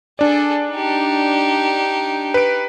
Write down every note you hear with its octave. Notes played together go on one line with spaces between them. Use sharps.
D4 G#4 A4 D5
D#4 G4
B4 D7